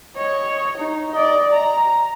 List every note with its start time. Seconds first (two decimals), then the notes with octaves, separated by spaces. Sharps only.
0.16 C#5 D#5
0.77 D#4
1.12 D5 D#5
1.51 A#5